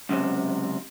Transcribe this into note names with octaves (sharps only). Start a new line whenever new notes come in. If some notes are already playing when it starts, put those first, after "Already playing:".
C#2 F#2 A2 C3